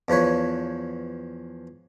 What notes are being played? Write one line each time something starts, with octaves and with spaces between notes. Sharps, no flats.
E2 F3 B4 C#5